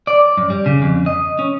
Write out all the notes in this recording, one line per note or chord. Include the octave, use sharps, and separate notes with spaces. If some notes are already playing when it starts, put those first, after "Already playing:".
D5
F#2
G3
C#3
F2
D#5
C#4